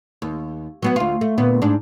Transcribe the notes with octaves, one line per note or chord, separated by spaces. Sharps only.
D#2
F#3 B3 F#4
D2 F4
A3
D2 A#2 B3
G#2 D4